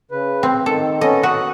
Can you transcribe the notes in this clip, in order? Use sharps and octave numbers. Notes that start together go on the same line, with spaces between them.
C#3 B4
C4
D#3 A4
B3 C#4 A4 D#5
F#4 D#6 F#6